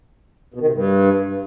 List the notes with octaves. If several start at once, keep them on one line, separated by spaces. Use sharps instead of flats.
B2
D#3
C3
G2